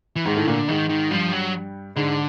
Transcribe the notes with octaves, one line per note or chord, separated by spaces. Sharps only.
E3
G#2 D#3 G#3
A2 A3
A#2 D3 A#3
G#2 D#3 G#3
D#3
G2 F3 G3
F#3
G#2 D3 G#3